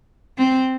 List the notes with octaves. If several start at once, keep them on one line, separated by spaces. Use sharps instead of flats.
C4